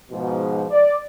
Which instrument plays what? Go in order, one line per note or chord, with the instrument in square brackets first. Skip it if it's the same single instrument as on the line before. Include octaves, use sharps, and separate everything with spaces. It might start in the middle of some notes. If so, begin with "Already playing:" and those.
[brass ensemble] G#2 B2 F3
D5